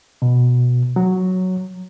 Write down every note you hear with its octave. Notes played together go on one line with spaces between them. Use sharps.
B2
F#3